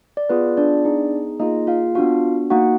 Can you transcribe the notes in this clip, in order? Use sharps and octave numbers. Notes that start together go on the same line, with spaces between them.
D5
B3 F4 G#4 B4
D4 D5
B3 D#4 G#4
A#3 D#4 F4 G#4 D#5
F4 F5
B3 D4 F4 F#4 F5
A#3 D#4 F#4 F#5